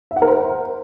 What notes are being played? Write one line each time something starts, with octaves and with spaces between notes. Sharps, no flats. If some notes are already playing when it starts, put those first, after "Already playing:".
E5
F#5
A#4
C5